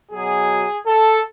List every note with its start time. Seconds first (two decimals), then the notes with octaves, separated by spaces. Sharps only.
0.11 B2 F#3 G#4
0.86 A4